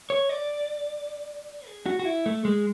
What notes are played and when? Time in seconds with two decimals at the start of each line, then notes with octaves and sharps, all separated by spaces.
0.10 C#5
0.29 D5
1.67 G#4
1.86 F#4
1.99 F#4
2.05 E4
2.26 A3
2.45 G#3